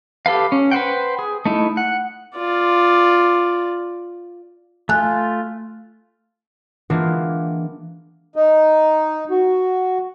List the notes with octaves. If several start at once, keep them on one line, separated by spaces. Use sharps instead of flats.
G4 A4 B4 F5
C#4
B4 C5 F#5 G5
G#4
A3 D#4 E4
F#5
F4 D5
A3 F4 G#5 F#6
E3 G#3 A#3 B3 D4 F4
D#4
F#4